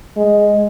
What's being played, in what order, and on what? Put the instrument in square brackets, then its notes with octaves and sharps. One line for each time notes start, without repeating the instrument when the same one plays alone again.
[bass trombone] G#3